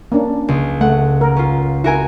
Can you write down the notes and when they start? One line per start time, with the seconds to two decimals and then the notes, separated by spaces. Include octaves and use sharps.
0.12 A#3 C#4 D4
0.48 C#2
0.81 A3 F#5
1.21 A#4
1.36 C#4 F4
1.84 E4 F#4 A#4 G#5